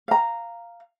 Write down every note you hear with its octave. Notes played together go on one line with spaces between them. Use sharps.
F5 A#5